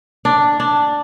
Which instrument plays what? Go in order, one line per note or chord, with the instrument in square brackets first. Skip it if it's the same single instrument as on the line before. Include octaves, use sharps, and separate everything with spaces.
[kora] D4
D4